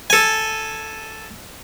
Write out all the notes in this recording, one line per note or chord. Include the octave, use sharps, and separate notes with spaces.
A4 G#5